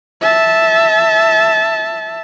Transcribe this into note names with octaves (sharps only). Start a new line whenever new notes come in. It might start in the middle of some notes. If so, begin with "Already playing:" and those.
E5 A5